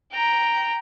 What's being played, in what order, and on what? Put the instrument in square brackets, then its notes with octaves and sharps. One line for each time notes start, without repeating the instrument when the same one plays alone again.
[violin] G5 A#5